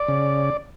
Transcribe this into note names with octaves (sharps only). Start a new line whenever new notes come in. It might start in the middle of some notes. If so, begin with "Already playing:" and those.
Already playing: D5
C#3